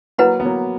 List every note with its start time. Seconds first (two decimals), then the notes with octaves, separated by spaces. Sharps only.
0.18 F#3 A#3 E4 B4 F#5 B5
0.40 B3
0.45 F#3 A#3